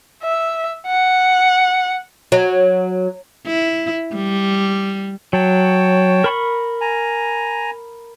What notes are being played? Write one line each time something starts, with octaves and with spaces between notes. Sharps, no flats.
E5
F#5
F#3
E4
G3
F#3 C#5 G5 A5
A#4 B5 C#6
G#5 A#5